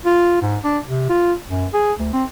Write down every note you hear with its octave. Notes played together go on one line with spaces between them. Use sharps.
F4
G#2
D4
C3
F4
F#2
G#4
D2
C4